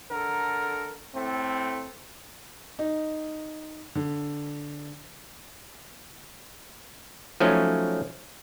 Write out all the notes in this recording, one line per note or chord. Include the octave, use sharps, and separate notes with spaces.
D3 A4 A#4
A2 A3 C4
D#4
D3
F3 F#3 A3 C#4 D#4